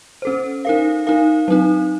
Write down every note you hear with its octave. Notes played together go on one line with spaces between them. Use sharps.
C#4 A4 C5
D#4 A#4 F5
D#4 A#4 F5
F#3 C4 D#4